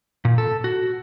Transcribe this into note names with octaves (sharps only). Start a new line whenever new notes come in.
A#2
A4
F#4